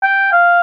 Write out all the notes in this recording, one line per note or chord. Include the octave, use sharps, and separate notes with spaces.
G5
F5